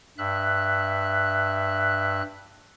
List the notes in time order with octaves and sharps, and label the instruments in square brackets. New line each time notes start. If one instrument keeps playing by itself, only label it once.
[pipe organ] G2 E5 F#6